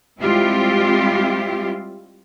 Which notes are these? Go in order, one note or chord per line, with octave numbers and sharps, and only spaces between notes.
G3 G#3 C4 E4 F4 G4